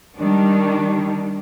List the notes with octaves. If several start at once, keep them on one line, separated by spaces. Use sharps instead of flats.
D#3 G3 D4